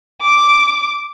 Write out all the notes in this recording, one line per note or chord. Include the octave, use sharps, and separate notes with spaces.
D6